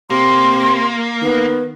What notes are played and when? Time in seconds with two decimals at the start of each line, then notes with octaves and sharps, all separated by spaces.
0.10 C3 A#3 C6
1.22 D#3 B3